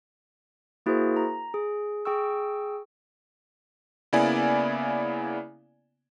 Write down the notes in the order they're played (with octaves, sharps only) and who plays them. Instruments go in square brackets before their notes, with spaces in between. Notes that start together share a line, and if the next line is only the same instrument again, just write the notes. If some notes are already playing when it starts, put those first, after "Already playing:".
[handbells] A#3 E4 F#4 G#4 A#4 C5
A#5
G#4
G#4 G5 C#6 E6
[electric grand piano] C#3 A#3 B3 E4 D5 G#5